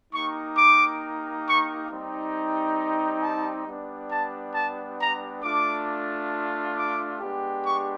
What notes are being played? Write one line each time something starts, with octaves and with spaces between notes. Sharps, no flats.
A#3 D#4 G4 C#6
D6
C#6
G3 C4 D#4
A5
G3 B3 D4
A5
A5
A#5
A3 D4 F4 D6
D6
G#3 B3 D4 G4
C#6